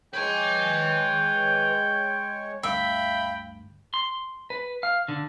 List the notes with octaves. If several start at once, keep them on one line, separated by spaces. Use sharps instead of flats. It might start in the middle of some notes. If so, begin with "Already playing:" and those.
G#3 B4 C#5 G5 G#5
D2 G2 E5 F5 G5 B5
C6
B4
F5
D3